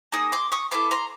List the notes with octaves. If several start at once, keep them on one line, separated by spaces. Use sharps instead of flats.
A#3 D#4 G#4 D#6
C6 D6
C#6 D#6
B3 E4 A4 C6 D6
A#5 C6